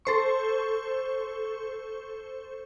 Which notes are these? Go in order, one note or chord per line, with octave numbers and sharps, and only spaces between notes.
A4 C5 C#6